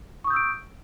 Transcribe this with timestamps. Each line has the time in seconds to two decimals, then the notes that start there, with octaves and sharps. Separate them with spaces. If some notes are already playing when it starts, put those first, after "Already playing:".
0.24 C#6
0.27 D#6
0.30 G6
0.33 E6
0.36 D7